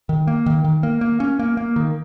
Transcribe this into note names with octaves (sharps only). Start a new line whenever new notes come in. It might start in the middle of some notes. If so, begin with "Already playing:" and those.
D#3
A#3
D#3
D#3
A#3
A#3
C#4
A#3
A#3
D#3